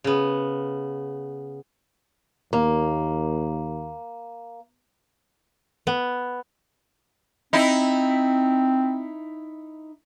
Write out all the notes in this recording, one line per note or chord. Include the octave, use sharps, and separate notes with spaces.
C#3 B3
D#2 A#3
B3
C4 D#4 E4